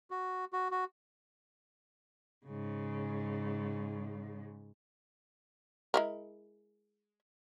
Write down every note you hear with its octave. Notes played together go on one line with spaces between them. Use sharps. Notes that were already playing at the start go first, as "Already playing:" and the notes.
F#4
F#4
F#4
G#2 C#3
G#3 E4 A#4